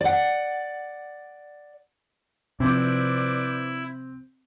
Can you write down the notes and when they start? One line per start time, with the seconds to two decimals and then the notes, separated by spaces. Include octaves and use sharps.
0.01 D5 F#5
2.60 C3 F3 C4 E4 B4 C5 D5